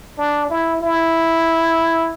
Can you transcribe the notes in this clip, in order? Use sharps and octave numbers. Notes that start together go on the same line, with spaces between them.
D4
E4
E4